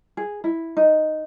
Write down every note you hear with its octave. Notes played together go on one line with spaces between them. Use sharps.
G#4
E4
D#4